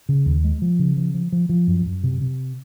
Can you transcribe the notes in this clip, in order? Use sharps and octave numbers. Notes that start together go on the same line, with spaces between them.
C#3
D#2
G#3
F3
C#3
F3
F3
F3
F3
F#2
F#2
C3
C3